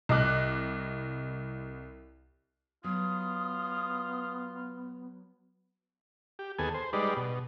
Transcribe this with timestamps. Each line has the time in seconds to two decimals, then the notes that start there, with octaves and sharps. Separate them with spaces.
0.09 C2 D#5 D6 F#6
2.84 F#3 B3 F4 D#6
6.39 G4
6.59 D#2 B3 G#4 A4 G#5
6.74 C5
6.93 G3 G#3 D#4 B4 D5
7.17 B2